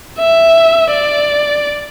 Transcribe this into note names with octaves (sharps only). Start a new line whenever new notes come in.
E5
D5